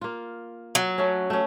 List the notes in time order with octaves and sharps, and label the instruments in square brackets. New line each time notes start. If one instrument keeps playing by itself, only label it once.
[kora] A#3 F4
[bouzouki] F#3
[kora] A3 C#4
A3 C#4